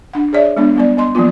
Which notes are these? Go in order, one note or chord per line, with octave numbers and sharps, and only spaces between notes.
D4 F#5
G#4 C#5 D5 E5
G#3 B3 D4
G3 B3 D5
B3 D#5 C6
F3 F#3 A#3 B3 F4